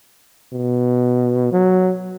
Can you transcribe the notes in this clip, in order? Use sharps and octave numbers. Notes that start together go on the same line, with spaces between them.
B2
F#3